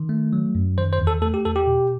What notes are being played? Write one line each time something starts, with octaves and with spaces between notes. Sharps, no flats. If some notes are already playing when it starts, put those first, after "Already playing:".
Already playing: D#3
A3
F#3
F#2
D#3 C5
C5
E2
A4
A3 A4
G4
E2 A4
G4
B2